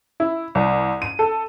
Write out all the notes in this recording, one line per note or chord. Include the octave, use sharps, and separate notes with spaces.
E4
C2
D#7
A4